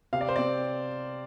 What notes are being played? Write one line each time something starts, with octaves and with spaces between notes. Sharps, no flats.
C3 F5
D5
C5
C4 D5